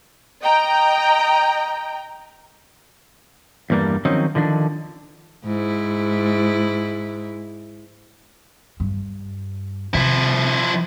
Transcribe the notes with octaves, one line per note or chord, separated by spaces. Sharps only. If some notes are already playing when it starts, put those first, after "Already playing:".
D#5 G5 A#5
E2 G2 G3 A#3 D4
D#3 F3 F#3 C4 C#4 D#4
D3 D#3 F3 D4
G#2 E4
G2
C3 F3 E4